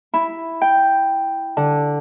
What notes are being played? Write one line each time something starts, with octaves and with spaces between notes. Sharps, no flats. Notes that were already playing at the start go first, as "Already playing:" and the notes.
E4
G5
D3